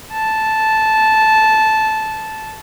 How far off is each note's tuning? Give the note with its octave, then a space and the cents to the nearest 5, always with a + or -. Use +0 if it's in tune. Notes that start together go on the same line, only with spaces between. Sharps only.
A5 -10